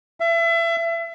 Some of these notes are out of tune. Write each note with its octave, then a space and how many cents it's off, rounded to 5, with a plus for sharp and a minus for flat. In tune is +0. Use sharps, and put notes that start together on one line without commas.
E5 +30